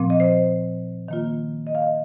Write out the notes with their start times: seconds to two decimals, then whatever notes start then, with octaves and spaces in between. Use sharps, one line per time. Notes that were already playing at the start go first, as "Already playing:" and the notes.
Already playing: A#2 F3 C4
0.10 D#5
0.20 C5
1.08 D#3 A#3 F4
1.67 D#5
1.75 F5
1.82 D#5